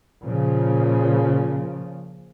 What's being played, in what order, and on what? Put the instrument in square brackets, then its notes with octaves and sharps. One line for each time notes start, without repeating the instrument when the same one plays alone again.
[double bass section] A#2 C#3 F3